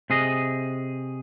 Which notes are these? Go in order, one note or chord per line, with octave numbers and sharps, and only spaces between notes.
C3 G#4 D#5